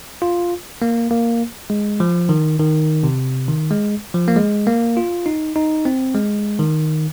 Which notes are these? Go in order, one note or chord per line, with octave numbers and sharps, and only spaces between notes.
F4
A#3
A#3
G#3
F3
D#3
D#3
C3
D#3
G#3
F3
A#3
G#3
A#3
F4
D#4
D#4
C4
G#3
D#3